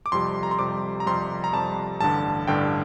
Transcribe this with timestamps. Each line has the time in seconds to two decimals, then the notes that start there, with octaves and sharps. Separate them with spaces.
0.06 D6
0.12 F2 C3 G3 C6
0.43 A#5
0.51 C6
0.59 F2 C3 G3 D6
1.00 A#5
1.06 F2 C3 G3 C6
1.44 A#5
1.53 F2 C3 G3 A5
2.01 A1 G2 D3 A5
2.47 A1 G2 D3 G5